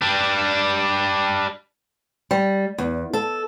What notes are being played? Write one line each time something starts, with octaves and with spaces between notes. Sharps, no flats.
G3 D4
G3
E2
A4